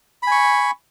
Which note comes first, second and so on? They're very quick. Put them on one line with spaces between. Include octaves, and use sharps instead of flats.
B5 G#5 C#6